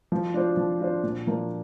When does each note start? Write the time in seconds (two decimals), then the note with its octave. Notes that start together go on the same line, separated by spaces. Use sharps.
0.12 F3
0.34 D4 F4 C5
0.57 F3
0.80 D4 F4 C5
1.03 A#2
1.27 F3 A#3 D4